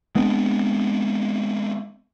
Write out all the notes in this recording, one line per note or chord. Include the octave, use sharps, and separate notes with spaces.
G#3 B3 C4 D4